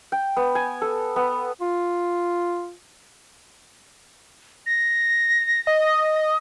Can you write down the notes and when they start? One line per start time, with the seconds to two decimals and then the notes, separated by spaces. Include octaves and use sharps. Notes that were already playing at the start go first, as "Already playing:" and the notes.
0.12 G5
0.36 B3
0.55 G#5
0.81 A4
1.16 B3
1.61 F4
4.66 A#6
5.67 D#5